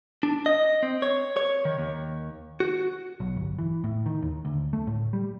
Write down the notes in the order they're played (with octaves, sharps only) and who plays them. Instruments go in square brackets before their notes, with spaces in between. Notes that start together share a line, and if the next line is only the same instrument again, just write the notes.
[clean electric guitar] D4
D#5
C4
C#5
C#5
D#3
D#2
F#4
[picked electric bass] B1
G1
E3
A2
D#3
D#2
D2
A3
A2
G3